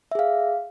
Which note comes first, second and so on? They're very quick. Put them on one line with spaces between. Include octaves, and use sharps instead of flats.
E5 G#4 F5